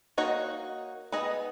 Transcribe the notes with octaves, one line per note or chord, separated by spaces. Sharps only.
A#3 D#4 F#4 C#5
B3 D#4 G#4 D#5